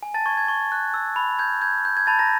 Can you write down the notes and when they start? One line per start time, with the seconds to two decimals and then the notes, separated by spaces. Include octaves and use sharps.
0.03 G#5
0.14 A5 A6
0.26 C#6 G#6
0.37 G#6
0.48 C#6
0.72 F#6
0.94 E6
1.16 B5
1.39 G6 G#6
1.61 G6 G#6
1.85 G6
1.97 G#6
2.07 A5 B5 A6
2.19 A#5 A#6